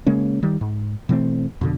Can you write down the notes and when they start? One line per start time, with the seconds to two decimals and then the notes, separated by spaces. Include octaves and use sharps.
0.06 C#3 G#3 A#3 C#4
0.43 D#3 G3
0.61 G#2
1.09 B2 E3 A3 C4
1.61 F2 B2 D3